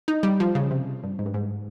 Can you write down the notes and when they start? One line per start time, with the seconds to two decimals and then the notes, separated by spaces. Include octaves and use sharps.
0.08 D#4
0.23 G3
0.40 F3
0.55 C#3
0.71 C3
1.03 G2
1.19 G#2
1.26 G2
1.34 G#2